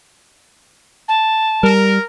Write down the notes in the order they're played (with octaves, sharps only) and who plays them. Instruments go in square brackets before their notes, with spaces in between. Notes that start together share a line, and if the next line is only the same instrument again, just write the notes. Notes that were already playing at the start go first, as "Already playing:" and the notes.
[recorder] A5
[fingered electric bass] G3 [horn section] A#4